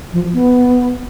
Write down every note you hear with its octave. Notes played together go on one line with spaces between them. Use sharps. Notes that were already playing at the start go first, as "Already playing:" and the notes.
F3
B3